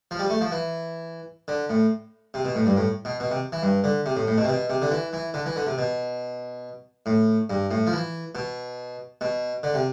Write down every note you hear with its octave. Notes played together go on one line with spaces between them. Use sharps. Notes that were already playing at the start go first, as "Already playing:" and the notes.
F3
G3
A3
F3
E3
D3
A2
C3
B2
A2
G2
A2
B2
B2
C3
E3
G2
D3
C3
A2
A2
B2
C3
B2
C3
D3
E3
E3
D3
E3
D3
C3
B2
A2
G2
A2
F3
E3
B2
B2
D3
C3